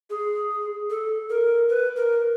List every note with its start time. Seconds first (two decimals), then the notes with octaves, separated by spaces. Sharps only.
0.10 G#4
0.90 A4
1.30 A#4
1.69 B4
1.96 A#4